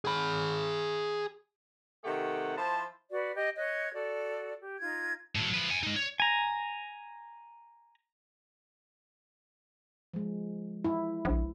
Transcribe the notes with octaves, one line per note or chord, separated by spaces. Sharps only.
G#4 B5
C3 D#3 A3 G4 F#5
F3 E4 C5 A5
F#4 B4 D5
G4 D#5
C#5 D#5 F#6 G#6
F#4 A4 D5
G4
D#4 F4 G#6
A2 F#3
F3 B4
F#5 G#5
G#3 D#4
C#5
G#5 A#5
F3 G#3
E4
A#1